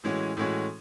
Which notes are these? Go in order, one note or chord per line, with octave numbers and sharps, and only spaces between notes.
A2 E3 G#3 C#4 F#4
A2 E3 G#3 C#4 F#4